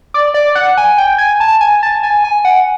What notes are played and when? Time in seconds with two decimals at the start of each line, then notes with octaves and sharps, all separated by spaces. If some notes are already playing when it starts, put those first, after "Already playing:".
0.14 D5
0.34 D5
0.55 F#5
0.77 G#5
0.98 G5
1.18 G#5
1.40 A5
1.61 G#5
1.83 A5
2.03 G#5
2.24 G#5
2.45 F#5